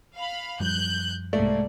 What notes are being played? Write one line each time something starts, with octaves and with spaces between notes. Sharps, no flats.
F5 B5
F#2 F3 G3 F#6 G6
C2 G#2 A3 A#3 D5